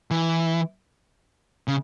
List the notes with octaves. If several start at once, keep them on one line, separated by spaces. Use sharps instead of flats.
E3
C#3